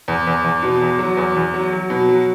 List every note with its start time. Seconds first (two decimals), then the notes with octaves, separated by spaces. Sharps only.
0.08 E2
0.27 E2
0.44 E2
0.63 B2
0.82 E2
0.99 F#3
1.17 E2
1.36 E2
1.54 F#3
1.73 F#3
1.90 B2
2.09 F#3